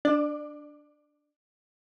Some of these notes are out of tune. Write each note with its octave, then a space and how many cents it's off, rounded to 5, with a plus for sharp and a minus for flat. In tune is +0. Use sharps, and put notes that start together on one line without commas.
D4 +0 D5 +25